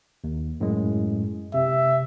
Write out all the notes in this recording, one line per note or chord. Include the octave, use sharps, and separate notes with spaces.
D#2
F#2 A2 G#3
C3 E5